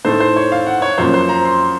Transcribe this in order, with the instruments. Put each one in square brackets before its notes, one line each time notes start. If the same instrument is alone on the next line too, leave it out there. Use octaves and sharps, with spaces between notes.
[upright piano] A2 A3 D#4 [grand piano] C5
[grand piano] C5
C#5
F5
F#5
C#5
[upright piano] F#2 F3 A#3 C#4 [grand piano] C5
[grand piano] C5
A#5
C6